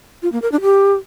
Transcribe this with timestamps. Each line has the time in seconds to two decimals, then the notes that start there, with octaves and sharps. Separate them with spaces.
0.22 F4
0.32 A#3
0.42 A#4
0.52 D4
0.62 G4